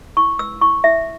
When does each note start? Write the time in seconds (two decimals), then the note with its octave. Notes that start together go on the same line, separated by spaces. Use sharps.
0.17 E4 C#6
0.39 B4 E6
0.61 E4 C#6
0.84 E4 E5